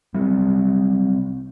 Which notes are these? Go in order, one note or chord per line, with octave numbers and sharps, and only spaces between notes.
C3 F#3 G3 C4